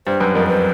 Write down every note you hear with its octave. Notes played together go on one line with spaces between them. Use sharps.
G2 C5
F#2 B4
F2 A#4
B4